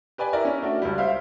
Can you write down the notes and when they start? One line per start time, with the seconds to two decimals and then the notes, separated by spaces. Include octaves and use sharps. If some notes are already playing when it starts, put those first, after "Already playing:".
0.18 G4 B4 D5 G#5
0.33 E4 A#4 D5
0.45 C#4
0.62 A3 D4 F#4
0.82 C#2 G3
0.98 C5 E5 F5